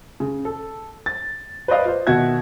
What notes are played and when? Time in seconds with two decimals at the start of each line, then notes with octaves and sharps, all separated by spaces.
0.20 C#3
0.45 A4
1.06 A6
1.68 B4 C5 D5 D#5 F5
1.85 F4 C5
2.07 B2 D#3 F#4 E5 G#6